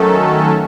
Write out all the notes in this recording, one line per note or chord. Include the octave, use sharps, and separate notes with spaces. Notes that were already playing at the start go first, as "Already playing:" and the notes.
Already playing: D#3 F#3 A3 C#4 A4